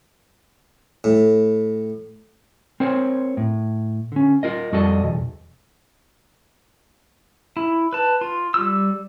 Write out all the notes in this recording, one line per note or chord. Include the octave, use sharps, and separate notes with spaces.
A2
C4 A#4 C5 C#5
A2
D3 C#4
F4 A#4 D#5
F2 G3 F#4 A4 D5 D#5
B1 E2
E4
B4 A5
F4
G3 E6